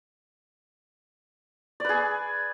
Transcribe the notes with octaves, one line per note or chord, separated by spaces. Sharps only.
G#4 B4 D5